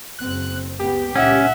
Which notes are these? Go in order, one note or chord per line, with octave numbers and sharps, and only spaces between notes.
F#1 C4 F#6
C#2 B3 G4
C#2 A#2 C#4 E5 F#5